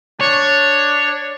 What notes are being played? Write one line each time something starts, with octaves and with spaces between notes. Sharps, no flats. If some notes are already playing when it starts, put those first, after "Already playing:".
D4 C#5